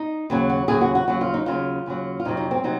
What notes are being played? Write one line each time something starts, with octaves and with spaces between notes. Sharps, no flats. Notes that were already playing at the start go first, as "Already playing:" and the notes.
Already playing: D#4
D#2 C#3 F#3
F#4
D#2 C#3 F#3 G#4
F#4
F#4
D#2 C#3 F#3 F#4
F4
D#4
D#2 C#3 F#3 F4
D#2 C#3 F#3
F4
F2 C3 F#3 D#4
D#4
C4
C3 F#3 D#4